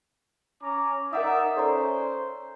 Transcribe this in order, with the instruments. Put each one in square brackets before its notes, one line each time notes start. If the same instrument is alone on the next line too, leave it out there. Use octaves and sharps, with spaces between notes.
[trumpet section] C#4 A#5 D6
[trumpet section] D#4 D5 E5 [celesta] A#4 F#5 D#6
[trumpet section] C#4 C5 [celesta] A4 D5 A#5